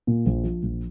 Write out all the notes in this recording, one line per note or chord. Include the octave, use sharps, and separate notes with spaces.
A#2
A#1
F3
A#1